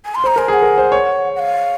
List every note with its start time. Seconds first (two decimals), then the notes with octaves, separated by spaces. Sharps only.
0.05 G#5
0.15 C6
0.24 C5 A#5
0.36 A#4 G#5
0.48 G#4 G#5
0.53 F#5
0.63 A#4
0.78 C5
0.92 C#5
1.36 F#5
1.39 F5